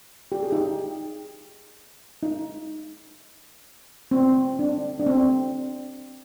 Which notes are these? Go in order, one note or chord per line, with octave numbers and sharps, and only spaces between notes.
G4
G#4
D#4 G4
D#4
C4
D4
D4
C4